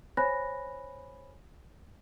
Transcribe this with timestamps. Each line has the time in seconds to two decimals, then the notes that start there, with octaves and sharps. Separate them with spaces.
0.17 C5 C#5 G#5 B5 F#6 A#6